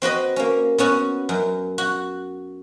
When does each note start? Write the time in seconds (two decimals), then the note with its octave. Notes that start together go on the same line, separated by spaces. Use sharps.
0.02 C4 F#4 B4 D#5
0.36 A#3 C#4
0.78 B3 C#4 F#4
1.29 F#2
1.78 F#4